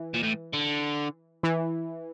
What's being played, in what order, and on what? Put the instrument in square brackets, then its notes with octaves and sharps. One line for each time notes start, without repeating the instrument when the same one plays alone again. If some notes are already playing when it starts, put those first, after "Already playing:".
Already playing: [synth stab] E3
[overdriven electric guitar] A#2
A2
D3
[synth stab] E3